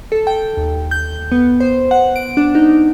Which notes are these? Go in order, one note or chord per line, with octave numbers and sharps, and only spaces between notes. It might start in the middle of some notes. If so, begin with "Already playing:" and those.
A4
G5
D#2
G6
B3
C5
F#5
D7
D4
D#4